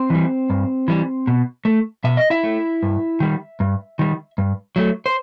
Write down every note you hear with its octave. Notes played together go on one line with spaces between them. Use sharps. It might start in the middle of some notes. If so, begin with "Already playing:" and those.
Already playing: C4 C5
E3 G3
G2
E3 G3
B2
A3
B2 E5
D#5
E4 E5
A3
G2
D#3 G3
G2
D#3 G3
G2
F#3 A3
C5